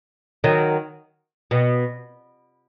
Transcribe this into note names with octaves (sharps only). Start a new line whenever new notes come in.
D#3 F#3
B2